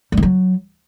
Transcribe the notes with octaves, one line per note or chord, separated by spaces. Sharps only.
G3
D#3
F#3